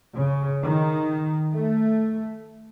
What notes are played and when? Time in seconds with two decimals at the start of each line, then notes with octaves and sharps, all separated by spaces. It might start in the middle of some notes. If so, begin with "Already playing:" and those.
0.16 C#3
0.62 D#3
1.53 A3